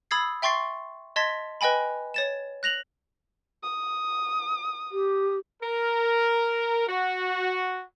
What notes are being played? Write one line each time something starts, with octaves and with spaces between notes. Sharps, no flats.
B5 D#6 E6 G#6 A6 C7
E5 G5 C6 C#6 A6 C7
D#5 A5 C6 G#6 A6 B6
B4 D#5 G5 G#5 B5
C#5 A6 E7
F#6 A#6 F7 F#7
D#6
G4
A#4
F#4